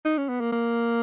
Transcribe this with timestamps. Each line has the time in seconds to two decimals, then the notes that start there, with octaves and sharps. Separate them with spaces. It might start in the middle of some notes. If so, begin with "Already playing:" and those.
0.05 D#4
0.18 C#4
0.29 B3
0.40 A#3
0.52 A#3